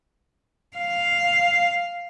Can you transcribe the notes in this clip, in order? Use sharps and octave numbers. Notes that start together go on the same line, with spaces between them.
F5